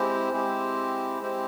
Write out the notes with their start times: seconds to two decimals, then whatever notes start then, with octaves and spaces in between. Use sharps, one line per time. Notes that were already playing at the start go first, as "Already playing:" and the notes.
Already playing: G#3 C4 E4 G4 C5
0.33 G#3 C4 E4 G4 C5
1.22 G#3 C4 E4 G4 C5